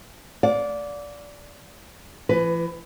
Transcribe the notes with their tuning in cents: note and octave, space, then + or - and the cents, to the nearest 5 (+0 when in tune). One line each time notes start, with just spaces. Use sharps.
D5 -15 F5 +40
E3 +45 B4 +15